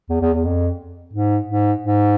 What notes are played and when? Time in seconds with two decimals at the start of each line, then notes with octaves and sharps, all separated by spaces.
0.09 E2
0.21 E2
0.33 E2
0.44 F2
1.13 G#2
1.48 G#2
1.83 G#2